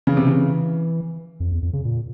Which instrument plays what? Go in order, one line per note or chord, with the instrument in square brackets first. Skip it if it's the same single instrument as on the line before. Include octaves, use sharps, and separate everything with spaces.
[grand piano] C#3 [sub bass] E3
[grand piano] C3
C#3
[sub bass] F2
E2
F2
C#3
A#2